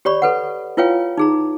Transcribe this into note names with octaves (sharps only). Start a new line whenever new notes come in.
G4 C#5 D5 B5 C#6
A4 B4 F#5
E4 F4 B4 C#5 F5 G5
D#4 G#4 A#5